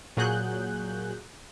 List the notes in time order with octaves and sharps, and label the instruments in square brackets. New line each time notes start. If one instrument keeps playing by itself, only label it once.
[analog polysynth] A#2 F#3 F#4 G#4 F#6 G6